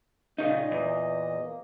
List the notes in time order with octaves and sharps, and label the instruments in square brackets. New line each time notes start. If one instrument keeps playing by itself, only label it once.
[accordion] A#2 D#5 [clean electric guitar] C#3 D#4
[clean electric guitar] E2
[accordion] A#3